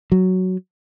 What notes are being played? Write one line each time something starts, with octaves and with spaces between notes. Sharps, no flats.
F#3